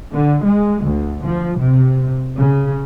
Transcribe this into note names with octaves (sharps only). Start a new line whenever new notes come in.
D3
G#3
D2
F3
C3
C#3